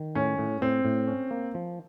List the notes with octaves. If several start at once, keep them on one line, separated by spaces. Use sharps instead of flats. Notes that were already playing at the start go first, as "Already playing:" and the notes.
Already playing: D#3
A2 C#4
A2
A2 C4
A2
C#4
A#3
F3